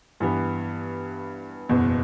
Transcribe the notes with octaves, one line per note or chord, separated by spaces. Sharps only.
G2 E3 B3
F#1 E2 B2